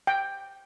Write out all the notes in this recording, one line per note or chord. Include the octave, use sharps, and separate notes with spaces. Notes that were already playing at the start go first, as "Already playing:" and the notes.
G5